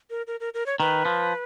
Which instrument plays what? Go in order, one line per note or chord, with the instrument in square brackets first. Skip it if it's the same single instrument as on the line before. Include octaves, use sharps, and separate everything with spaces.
[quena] A#4
A#4
A#4
A#4
C#5
[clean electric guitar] D#3 [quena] B4
[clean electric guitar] F3